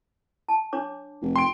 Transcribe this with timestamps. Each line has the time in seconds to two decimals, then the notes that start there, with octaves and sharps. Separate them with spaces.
0.49 A5
0.73 D4 C#5 D6
1.22 F1
1.36 G5 C6 D7